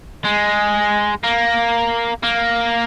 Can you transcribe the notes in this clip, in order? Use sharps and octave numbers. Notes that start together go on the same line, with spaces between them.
G#3
A#3
A#3